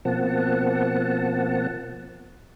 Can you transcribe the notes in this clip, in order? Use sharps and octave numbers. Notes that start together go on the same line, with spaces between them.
B2 F3 A#3 C4 F#5 A5